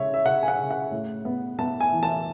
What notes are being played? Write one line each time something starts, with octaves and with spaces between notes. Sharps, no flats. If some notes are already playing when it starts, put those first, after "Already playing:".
Already playing: C#3 G#3 C#5 E5
E5
C#3 F#5
G#5
F#5
C#3
F#5
A2
B3
B3 A5
G#5
E3
A5